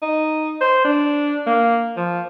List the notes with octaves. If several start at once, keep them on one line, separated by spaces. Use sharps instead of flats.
D#4
C5
D4
A#3
F3